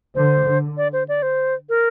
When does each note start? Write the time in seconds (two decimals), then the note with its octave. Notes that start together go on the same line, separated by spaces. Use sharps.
0.15 D3 C5
0.46 D3
0.77 D5
0.93 C5
1.08 D5
1.22 C5
1.69 A#4